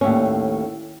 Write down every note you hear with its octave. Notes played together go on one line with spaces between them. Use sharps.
D#2 A2 C#4